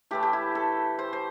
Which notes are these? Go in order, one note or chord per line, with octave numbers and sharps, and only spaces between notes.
A2 E3 A3 G4
G4
E4
A4
C5
C5